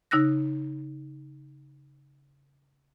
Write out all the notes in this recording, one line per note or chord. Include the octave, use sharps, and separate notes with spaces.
C#3 D#4 E6 F#6 A#6